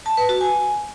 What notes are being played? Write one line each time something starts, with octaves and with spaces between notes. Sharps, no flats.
A5
B4
F#4
G#5